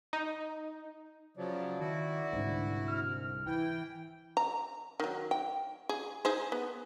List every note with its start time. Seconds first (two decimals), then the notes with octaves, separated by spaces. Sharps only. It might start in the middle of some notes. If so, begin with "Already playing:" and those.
0.13 D#4
1.37 C#3 F3 F#3 D5
1.79 D#3 E4 F#4
2.32 C2 G#2 D3
2.88 F6
3.46 E3 E4 G5
4.37 A#5
5.00 D#3 F#3
5.31 G5
5.89 G#4
6.25 D#4 G#4 C5
6.52 B3